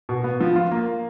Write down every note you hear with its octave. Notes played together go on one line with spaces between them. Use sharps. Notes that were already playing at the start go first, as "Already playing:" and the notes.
B2
B3
F3
F4
A#3